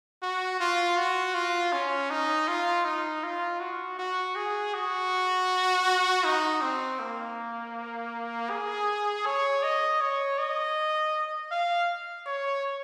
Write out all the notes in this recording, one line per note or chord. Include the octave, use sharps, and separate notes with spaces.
F#4
F4
F#4
F4
C#4
D#4
F4
D#4
F4
F#4
F#4
G#4
F#4
D#4
C4
A#3
G#4
C#5
D#5
C#5
D#5
F5
C#5